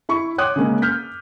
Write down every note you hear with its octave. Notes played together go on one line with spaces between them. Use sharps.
E4 B5 C#6
C#5 G5 C6 D6 D#6 F#6
C#3 G#3 A#3 C#4
F6 G6 B6